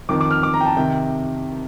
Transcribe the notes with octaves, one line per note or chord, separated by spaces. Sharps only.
F2 D#3 D6
D6
F6
D6
A#5
G5
A5
C3 D#3 G5